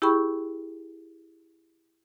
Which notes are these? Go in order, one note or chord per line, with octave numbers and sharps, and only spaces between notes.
E4 G4 G#4 G5 B5 C#6